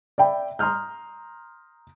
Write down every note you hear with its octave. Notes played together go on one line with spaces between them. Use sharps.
D5 E5 G5 B5
A#5 C6 D#6 F6 G6